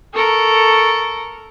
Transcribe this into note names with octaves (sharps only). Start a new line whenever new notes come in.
A4 A#4 C#6